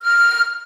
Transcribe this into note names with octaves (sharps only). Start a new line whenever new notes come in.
F6